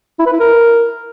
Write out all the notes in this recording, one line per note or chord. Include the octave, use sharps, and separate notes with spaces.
E4
B4
E4
A#4